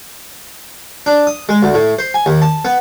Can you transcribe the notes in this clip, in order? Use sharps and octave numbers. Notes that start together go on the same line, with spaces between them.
D4
D#6
G#3
D2
A2
C5
G#5
D#2
A5
B3